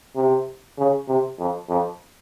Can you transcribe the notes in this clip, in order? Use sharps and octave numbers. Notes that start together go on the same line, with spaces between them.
C3
C#3
C3
F2
F2